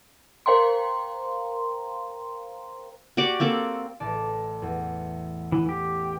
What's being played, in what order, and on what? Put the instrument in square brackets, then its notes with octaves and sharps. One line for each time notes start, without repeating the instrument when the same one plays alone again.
[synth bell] A#4 C5 F5 G5 A#5 C6
[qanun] F#4 G4 D5
A#3 C4 A4 D5
[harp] A1 D5 A5
E2
[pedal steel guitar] E3
G4